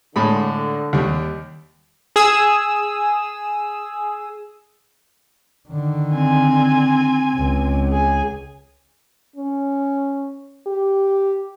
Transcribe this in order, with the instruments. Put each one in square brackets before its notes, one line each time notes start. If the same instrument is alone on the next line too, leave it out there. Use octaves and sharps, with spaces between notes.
[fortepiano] A2 G#3 B5 [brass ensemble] D3
[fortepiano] D#2 G3
[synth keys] G#4 D#6 E6
[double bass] D3 D#3
[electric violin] C4 G#5
[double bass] C#2
[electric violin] G#4 G#5
[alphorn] C#4
G4